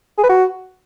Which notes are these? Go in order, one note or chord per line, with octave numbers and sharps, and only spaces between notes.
G#4
B4
F#4